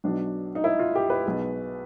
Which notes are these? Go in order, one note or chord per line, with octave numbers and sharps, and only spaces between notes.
B1 B2 F#3 D4
D#4
E4
F4
G4
B4
B1 B2 G#3